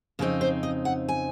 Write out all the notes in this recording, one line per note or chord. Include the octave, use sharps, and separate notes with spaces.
F2 C#3 G#3 C4 D#4
C5
D#5
F#5
G#5